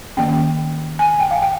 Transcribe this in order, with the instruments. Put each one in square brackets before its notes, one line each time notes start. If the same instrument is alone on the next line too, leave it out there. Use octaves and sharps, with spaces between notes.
[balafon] D#3 A#3 C#4 G5
G#5
G5
F5
G5